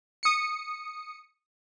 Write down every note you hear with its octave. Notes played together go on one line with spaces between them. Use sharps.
D#6 C#7